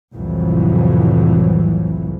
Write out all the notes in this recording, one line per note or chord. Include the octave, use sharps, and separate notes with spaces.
C2 F2 A2 E3 F#3